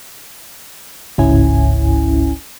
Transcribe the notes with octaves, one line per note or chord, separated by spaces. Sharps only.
G1 C#2 G#2 C#4 E4 G#5